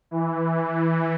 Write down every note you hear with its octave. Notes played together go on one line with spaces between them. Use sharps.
E3